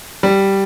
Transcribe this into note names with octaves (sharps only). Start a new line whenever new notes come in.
G3